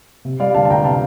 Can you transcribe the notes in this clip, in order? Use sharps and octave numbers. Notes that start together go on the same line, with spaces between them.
C3
G3 D5 F5
D2 F5 A5
A5
D2 G5 A#5
C3 F5 A5